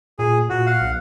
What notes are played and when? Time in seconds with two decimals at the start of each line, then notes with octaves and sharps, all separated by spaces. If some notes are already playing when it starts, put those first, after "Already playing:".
0.19 A#2 G#4
0.50 A#2 F#4
0.67 F5 F#5
0.81 B1